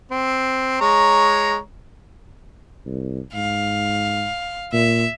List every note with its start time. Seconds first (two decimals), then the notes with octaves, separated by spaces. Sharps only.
0.11 C4
0.81 G#3 C#5 A#5
2.86 C2
3.34 G#2 F5
4.73 A#2 E5